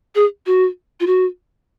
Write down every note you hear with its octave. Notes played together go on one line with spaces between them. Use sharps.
G#4
F#4
F4
F#4